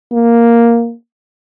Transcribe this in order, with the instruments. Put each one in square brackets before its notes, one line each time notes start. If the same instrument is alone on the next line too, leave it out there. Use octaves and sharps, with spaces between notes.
[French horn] A#3